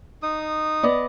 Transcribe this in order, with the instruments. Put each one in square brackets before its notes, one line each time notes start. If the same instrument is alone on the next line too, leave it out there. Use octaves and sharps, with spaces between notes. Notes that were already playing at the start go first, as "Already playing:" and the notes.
[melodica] D#4 D#6
[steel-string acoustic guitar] B3 D5 D#5